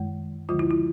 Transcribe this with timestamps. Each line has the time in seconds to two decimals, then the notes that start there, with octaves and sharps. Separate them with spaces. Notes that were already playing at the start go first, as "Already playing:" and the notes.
Already playing: F#2 D#3 G#3
0.49 D2 D3 F3 G#3 F4
0.59 E4
0.71 E4